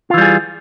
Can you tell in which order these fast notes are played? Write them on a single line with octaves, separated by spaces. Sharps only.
F4 E3 G3 G#4